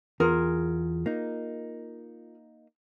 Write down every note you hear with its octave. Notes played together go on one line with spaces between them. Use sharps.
E2 F4 G#4 A#4
A#3 D#4